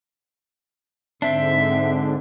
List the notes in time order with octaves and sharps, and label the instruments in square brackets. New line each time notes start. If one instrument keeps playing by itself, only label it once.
[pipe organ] G#2 D3 [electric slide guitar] C4 D4 [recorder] E5